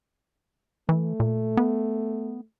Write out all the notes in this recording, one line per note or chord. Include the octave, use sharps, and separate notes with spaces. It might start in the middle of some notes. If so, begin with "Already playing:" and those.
E3 A3
A#2
B3